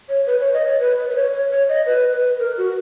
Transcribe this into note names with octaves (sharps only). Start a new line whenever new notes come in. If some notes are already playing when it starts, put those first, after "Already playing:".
C#5
B4
C#5
D#5
C#5
B4
B4
B4
C#5
C#5
C#5
D#5
B4
B4
A#4
F#4